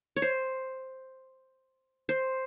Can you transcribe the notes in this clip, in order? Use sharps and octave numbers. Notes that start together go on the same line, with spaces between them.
C#5
C5
C5